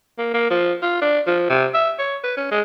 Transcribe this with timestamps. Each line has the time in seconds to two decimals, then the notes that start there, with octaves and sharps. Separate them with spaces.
0.18 A#3
0.34 A#3
0.50 F3
0.83 F4
1.02 D4
1.27 F3
1.50 C3
1.74 E5
1.99 C#5
2.24 B4
2.37 C#4
2.51 G#3